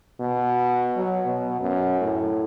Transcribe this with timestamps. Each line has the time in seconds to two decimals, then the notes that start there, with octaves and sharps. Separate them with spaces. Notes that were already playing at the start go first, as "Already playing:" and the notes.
0.19 B2
0.96 F#3
1.26 B2
1.61 F#2
2.01 A2